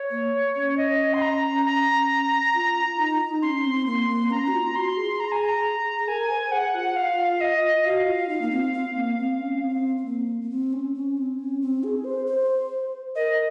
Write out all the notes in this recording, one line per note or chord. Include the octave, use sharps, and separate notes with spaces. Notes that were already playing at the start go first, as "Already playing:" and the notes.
Already playing: C#5
A#3
C#4
D#5
C6
A#5
A#5
F4
D#4
C#4 C6
C4
A#3 C6
A#3
C#4 A#5
F#4
F4
F#4 C6
G#4
A#5
G#5
A#5
G#4
A#4 G#5
C5
G#4 F#5
F4
F5
D#5
F#4 F5
F4
D#4
A#3
C4
C4
A#3
C4
C#4
C4
C4
A#3
A#3
C4
C#4
C#4
C4
C#4
C4
G#4
C5
C5
A#4 D#5